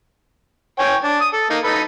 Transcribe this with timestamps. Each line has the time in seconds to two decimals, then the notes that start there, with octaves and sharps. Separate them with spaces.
0.79 C#5 G5 G#5
1.04 D4
1.21 D#6
1.33 A4
1.50 A#3 D#4
1.64 D#4 A4 B4